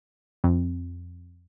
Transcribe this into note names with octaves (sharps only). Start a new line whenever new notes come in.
F2